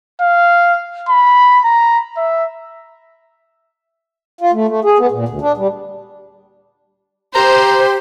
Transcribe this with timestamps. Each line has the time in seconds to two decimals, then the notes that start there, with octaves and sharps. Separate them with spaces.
0.21 F5
1.09 B5
1.65 A#5
2.17 E5
4.41 F4
4.53 A3
4.68 A3
4.84 G#4
4.98 B3
5.11 A#2
5.28 D2
5.41 D4
5.57 G3
7.35 G4 C5 A#5